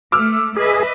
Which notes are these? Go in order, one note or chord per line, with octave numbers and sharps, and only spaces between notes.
A3 D6 E6 F6
G#4 B4 D#5 E5